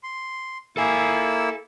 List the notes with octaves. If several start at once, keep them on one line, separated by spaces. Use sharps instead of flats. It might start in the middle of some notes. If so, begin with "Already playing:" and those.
C6
A#3 E4 A4 G#5 E6